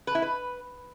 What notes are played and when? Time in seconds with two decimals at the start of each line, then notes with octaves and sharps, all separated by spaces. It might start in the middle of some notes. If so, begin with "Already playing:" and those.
0.07 B4
0.15 E4
0.22 B4